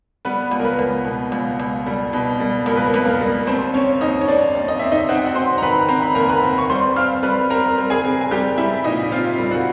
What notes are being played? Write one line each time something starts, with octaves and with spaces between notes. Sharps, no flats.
G3 B3 B4
C#2
A#4
B3 B4
C#2
B2
C#2
C#2
G3
B2
G3
C#2 A#4
B4
A#4
C#2 B4
A#3 A#4
G3
D#2 C4 C5
C4 C#4 C#5
D#2 D#4 D#5
C#5
C4 D4 D5
D#2
D#5
C4 E5
D#4 D#5
C4 F#5
G5
F#4 F#5
C4 C5 C6
A#5
D#3 B4 B5
C4 A#5
B5
D#2 A#4 A#5
B4 B5
C4
C#6
G3 C5 C6
C4 F5 F6
G3 B4 B5
C4 A#4 A#5
G3
G#4 G#5
C4
G#5
G3 G4 G5
G3 E4 E5
A#2 D#4 D#5
C4 F4 F5
G3
F#4 F#5